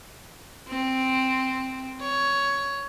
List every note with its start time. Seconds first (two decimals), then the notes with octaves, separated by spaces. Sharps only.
0.68 C4
2.02 C#5